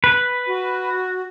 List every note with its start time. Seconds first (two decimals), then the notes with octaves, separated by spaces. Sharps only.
0.04 B4
0.47 F#4